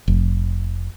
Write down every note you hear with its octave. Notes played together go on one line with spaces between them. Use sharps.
F1